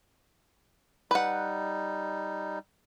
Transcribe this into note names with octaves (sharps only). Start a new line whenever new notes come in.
G3 D#4 B4 F#5